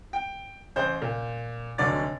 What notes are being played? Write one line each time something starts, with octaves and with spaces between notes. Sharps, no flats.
G5
A1 C5 G6
A#2
F1 D2 D3 F#3 D5 A6